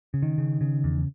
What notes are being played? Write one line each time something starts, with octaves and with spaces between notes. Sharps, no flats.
C#3
D#3
C#3
C#3
E2